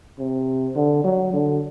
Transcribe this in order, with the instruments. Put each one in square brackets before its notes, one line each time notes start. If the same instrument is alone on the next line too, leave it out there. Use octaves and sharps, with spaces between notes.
[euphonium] C3
D3
F#3
D3